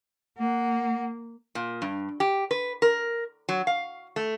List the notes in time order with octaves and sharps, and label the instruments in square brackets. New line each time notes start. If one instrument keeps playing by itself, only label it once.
[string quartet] A#3 [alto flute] F#5
[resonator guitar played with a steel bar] A#2
G2
G4
B4
A#4
F#3
F5
A3